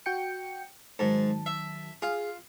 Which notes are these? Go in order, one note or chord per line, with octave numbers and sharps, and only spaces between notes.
F#4 G5 C#7
G#2 D#3 F#3 A5
E5
F4 G#4 F5